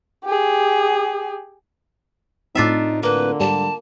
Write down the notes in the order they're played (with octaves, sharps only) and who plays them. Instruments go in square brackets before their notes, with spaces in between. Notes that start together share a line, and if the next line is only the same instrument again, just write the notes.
[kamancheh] G4 G#4
[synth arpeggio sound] A2 C4 [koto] D4 F4 E5 [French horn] D#4
[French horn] D3 [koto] A#3 [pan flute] B4
[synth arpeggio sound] G#2 G3 [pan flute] A5